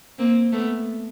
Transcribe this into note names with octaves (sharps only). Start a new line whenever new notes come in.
A#3 C4
A3 B3